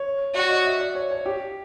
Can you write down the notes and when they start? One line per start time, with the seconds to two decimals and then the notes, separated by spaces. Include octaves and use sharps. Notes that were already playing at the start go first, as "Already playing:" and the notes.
Already playing: C#5
0.34 F#4 D5
0.49 D#5
0.65 E5
0.80 D5
0.95 C#5
1.11 C#5
1.26 G4